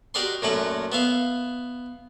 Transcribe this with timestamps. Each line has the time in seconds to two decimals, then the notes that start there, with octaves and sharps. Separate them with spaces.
0.14 F#4 G4 A#4 D5 D#5 C6
0.42 F#2 A#2 F#3 A3 F#5 G5
0.92 B3 E5 F5